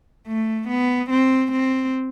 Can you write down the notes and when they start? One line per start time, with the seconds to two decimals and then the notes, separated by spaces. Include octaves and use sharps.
0.27 A3
0.69 B3
1.10 C4
1.52 C4